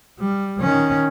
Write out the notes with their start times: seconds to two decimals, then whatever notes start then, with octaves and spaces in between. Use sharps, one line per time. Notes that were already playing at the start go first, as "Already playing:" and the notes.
0.19 G3
0.61 D#3 C#4